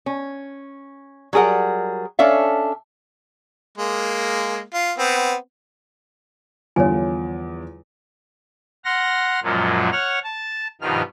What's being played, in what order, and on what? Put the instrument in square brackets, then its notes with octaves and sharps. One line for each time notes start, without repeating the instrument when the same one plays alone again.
[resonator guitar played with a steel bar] C#4
F#3 G3 G#4 A#4 F#5
C#4 D4 A4 C#5 E5 F5
[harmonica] G#3 A#3
F4
B3 C4
[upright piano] E2 F3 [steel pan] D3 G3 F4 [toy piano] C#5 G#5
[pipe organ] F#5 C6 F6 A#6
F#2 A#2 F3 F#3 G#3
C#5 F#5 F6
A5
G2 B2 D#3 F3 F6